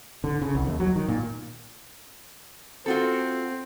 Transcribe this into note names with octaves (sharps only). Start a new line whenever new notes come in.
D3
C#3
C2
D#2
F#3
D#3
A#2
C4 F4 F#4 A4